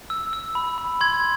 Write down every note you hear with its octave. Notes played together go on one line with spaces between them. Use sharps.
E6
E6
B5
B5
C6 G#6